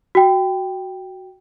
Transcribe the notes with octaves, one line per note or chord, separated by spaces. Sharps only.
F#4 G5